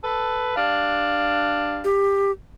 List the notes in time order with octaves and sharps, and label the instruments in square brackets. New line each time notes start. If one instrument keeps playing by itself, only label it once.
[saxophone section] A4 B4
G2 D4 F5
[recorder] G4